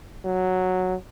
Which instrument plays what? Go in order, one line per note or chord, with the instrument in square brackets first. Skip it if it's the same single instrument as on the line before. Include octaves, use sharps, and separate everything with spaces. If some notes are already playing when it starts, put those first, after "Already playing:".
[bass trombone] F#3